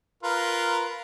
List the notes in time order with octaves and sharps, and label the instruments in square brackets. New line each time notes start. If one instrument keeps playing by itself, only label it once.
[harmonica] F4 A#4 B4